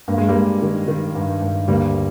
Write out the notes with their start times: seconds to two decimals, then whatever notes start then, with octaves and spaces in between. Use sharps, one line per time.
0.08 G2 A#3
0.18 G#3
0.28 G3 A#3
0.35 G2
0.62 D#3
0.88 D#3
1.15 G2
1.42 G2
1.68 D2 G3 A#3